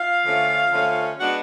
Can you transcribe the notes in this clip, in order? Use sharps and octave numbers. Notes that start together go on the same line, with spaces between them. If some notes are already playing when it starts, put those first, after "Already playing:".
Already playing: F4 F5
D3 F3 A3 C#4
D3 F3 A3 C#4
G#3 B3 D4 F#4 F#5